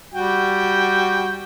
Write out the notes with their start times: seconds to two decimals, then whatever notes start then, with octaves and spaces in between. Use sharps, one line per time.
0.14 G3 F#4 G5